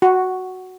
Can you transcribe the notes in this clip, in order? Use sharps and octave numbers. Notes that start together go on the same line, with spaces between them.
F#4